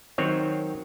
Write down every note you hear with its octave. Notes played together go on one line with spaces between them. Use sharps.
D#3 F#3 C4 C#5